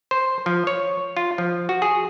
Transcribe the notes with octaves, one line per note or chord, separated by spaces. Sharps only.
C5
F3
C#5
F4
F3
F#4
G#4